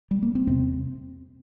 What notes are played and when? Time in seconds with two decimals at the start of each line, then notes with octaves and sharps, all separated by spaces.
0.11 G3
0.23 A#3
0.35 C4
0.47 E2 C3 C4